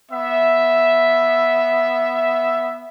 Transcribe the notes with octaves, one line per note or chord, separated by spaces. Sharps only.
B3 E5